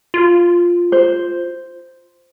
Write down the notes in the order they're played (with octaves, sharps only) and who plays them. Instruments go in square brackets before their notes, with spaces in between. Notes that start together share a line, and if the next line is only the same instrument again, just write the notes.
[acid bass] F4
[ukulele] C5